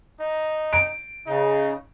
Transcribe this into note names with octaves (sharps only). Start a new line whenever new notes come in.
D#4
D7
C#3 D#4